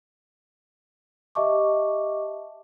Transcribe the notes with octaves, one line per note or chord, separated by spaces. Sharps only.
G4 D#5 E5 A5 C#6 D6